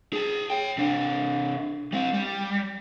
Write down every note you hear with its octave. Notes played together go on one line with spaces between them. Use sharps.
G#4 A5
C#5 G5
C3 D4
G3 C4
G3